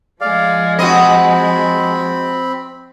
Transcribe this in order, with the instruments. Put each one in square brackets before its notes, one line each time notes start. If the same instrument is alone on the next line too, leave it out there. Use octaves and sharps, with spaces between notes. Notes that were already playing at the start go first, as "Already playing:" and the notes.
[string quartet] F3 G#3 [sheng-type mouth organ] D5 F5
[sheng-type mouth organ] C4 B5 [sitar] F#4 D#5